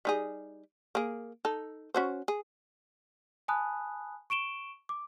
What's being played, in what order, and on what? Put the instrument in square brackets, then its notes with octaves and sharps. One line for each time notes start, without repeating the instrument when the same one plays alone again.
[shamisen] G3 D#4 G#4
A#3 G#4
D#4 A4
C#4 F#4 C5
G#4
[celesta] G#5 A5 B5 D#6 F#6
C#6 D7 E7 G7
D6